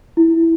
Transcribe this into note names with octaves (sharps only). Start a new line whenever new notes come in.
E4